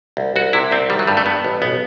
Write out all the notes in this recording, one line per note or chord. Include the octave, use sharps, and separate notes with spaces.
C2
C2 F#4
C3 E4
C2 C4
D#3 G3
F#3
G2 G3
A3
G2 B3
A1
B1 B3